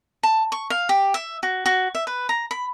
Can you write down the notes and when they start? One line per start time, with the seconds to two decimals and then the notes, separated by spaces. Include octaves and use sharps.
0.23 A5
0.52 C#6
0.70 F5
0.89 G4
1.14 E5
1.43 F#4
1.66 F#4
1.95 E5
2.07 B4
2.29 A#5
2.51 B5